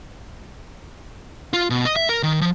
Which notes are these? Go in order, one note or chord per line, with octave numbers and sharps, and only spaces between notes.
F4
B2
D#5
E5
A#4
D#3
F3